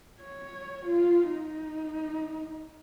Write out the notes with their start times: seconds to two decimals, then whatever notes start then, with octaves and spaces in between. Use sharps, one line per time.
0.21 C#5
0.85 F4
1.29 D#4